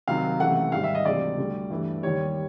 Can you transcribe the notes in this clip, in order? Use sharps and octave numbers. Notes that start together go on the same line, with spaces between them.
C2 C3 D#3 F#3 F5
C#2 C3 E3 A3 F#5
G#2 D#3 G3 F5
E5
D#5
D2 C3 E3 G#3 D5
D2 D3 G3
G2 E3 A3
D#2 D#3 G3 C#5